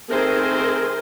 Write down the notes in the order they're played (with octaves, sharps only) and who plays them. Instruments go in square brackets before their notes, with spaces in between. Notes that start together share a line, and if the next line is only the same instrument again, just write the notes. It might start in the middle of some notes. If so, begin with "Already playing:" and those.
[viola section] D#3 G#4 C5 [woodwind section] A3 C4 A#4